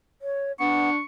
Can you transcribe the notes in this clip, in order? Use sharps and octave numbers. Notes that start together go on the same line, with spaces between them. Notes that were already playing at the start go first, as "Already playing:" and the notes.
C#5
B3 D4 C#6